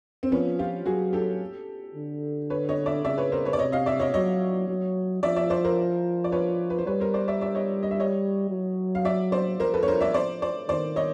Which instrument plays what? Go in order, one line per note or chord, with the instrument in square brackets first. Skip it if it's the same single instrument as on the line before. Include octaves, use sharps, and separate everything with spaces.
[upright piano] C4
[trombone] F3 [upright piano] B3 C#4
[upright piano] F4 G4
[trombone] F#3 [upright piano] F#4 G#4
[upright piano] G4 A4
[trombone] D3
[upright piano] B4 C#5
C#5 D#5
D5 E5
[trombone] C#3 [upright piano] D5 E5
[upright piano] B4 C#5
A#4 C5
B4 C#5
D5
[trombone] C3 [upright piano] C#5 D#5
[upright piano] D#5 F5
D5 E5
C#5 D#5
[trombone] F#3 [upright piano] C#5 D#5
[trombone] F#3
[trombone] F3 [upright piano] D5 E5
[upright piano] D5 E5
C5 D5
A#4 C5
D5
B4 C#5
B4
C5
[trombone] G3 [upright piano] B4 C#5
[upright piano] A#4 C5
C5 D5
D5 E5
D5 E5
C#5 D#5
D#5
E5
C#5 D#5
[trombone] F#3
[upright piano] F5
D5 E5
C5 D5
[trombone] F3 [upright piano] A#4 C5
[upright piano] A4 B4
C#5
A#4 C5
D5 E5
C5 D5
C5 D5
[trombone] D#3 [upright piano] C5 D5
[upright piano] C#5 D#5